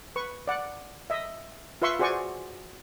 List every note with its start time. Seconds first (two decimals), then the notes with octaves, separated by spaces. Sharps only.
0.16 B4 C#6
0.48 D5 F#5
1.10 D#5 E5
1.82 F4 B4 E5 C6 C#6
1.99 F#4 G#4 C5 D5 G#5 C#6